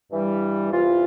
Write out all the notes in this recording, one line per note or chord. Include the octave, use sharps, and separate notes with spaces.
G2 E3 G3
E2 C3 E3 F4